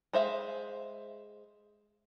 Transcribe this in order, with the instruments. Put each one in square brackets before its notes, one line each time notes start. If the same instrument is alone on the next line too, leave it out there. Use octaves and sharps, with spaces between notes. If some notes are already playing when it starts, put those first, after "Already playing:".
[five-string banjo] G#3 C5 E5 F5